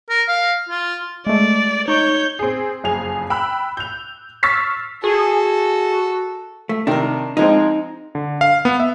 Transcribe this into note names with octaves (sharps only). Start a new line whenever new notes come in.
A#4
F5
F4
G#3 A3 D5
D#4 C#5 C#6 G6
C4 G#4
F#1 F2 G#4 G#5 F7
G5 B5 E6 F#6
G6 F7
C#6 E6 F6 A6 B6 C7
F#4 G#4 A4
A3
C3 D#3 D4 A#4
F3 G#3 C4 D#4
D3
F5
B3
E5